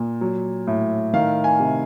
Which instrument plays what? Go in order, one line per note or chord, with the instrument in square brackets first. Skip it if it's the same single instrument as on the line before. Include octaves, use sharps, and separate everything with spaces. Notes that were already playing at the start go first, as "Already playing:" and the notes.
Already playing: [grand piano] A#2
F#3
A2
D#3 F5
G#5
C3